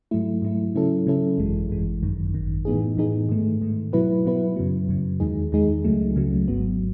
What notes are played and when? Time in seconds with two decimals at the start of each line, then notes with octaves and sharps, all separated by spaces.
0.11 G#2 F#3 A3 E4
0.42 G#2 F#3 A3 E4
0.75 C#3 F#3 C#4 E4 A4
1.07 C#3 F#3 C#4 E4 A4
1.38 G#1 F#2 E3 G#3
1.70 G#1 F#2 E3 G#3
2.03 G#1 F#2 D#3
2.34 G#1 F#2 D#3
2.65 A2 E3 B3 D#4 G#4
2.97 A2 E3 B3 D#4 G#4
3.29 G#2 D#3 A3
3.62 G#2 D#3 A3
3.93 B2 F#3 B3 E4 B4
4.25 B2 F#3 B3 E4 B4
4.56 F#2 C#3 F#3
4.89 F#2 C#3 F#3
5.20 E2 D#3 G#3 D#4 G#4
5.52 E2 D#3 G#3 D#4 G#4
5.84 C#2 C#3 F#3 A3
6.16 C#2 C#3 F#3 A3
6.48 G#1 G#2 F#3 B3